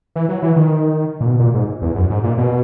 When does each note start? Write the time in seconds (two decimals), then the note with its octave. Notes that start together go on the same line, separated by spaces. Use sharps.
0.16 E3
0.29 F#3
0.43 E3
0.56 D#3
1.21 A#2
1.26 B2
1.40 A#2
1.54 G#2
1.82 E2
1.96 F#2
2.10 G#2
2.24 A#2
2.38 B2